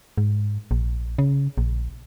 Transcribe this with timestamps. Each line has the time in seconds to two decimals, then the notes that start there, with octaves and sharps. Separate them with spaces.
0.18 G#2
0.71 A#1
1.19 C#3
1.58 A#1